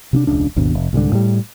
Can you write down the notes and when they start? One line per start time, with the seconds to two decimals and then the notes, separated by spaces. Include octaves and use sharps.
0.13 C3 C#4 D4
0.27 E1 C#2 C#3 D4
0.56 G#1 D#2 B2 D4
0.75 F1
0.93 C2 G#2 B2 D3
1.12 A2 G3